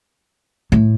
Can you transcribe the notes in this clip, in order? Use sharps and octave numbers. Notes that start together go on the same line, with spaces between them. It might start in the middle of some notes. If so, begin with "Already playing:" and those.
A2